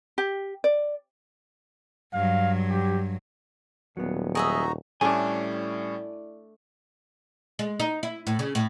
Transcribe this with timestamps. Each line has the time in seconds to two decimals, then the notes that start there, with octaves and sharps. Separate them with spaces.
0.18 G4
0.64 D5
2.13 G2 F#3 F5
2.70 G4
3.97 D#1 F#3 B3
4.35 D#4 F#4 G#4 D#5 E5 A#5
5.01 A2 G3 A3 C#4 D4 E4 D5 G#5
7.59 G#3
7.80 D#4
8.03 E4
8.27 A2
8.39 C#3
8.55 A2